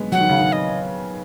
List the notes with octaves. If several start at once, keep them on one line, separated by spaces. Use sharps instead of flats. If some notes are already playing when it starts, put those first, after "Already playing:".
Already playing: F#3 G#3 B3
F#3 F#5
D#3
C#3
D#3
D#5